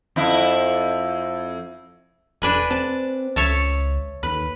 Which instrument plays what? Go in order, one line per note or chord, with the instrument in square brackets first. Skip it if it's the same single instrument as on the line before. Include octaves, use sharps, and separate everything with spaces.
[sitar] F2 E4
[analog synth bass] E1 [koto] D4 B4 G#5
[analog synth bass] C4 [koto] A5
[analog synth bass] C#2 [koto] C#5 E5 A5
[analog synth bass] D#2 [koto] B4